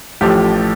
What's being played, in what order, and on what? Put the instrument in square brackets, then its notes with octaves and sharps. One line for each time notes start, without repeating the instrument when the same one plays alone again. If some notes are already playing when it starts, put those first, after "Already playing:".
[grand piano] A1 A2 F3 G4